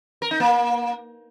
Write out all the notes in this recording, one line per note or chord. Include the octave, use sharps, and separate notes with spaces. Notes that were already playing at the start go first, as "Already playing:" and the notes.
A#4
D#4
A#3